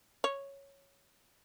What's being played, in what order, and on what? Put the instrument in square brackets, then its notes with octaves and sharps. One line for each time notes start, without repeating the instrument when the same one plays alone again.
[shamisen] C#5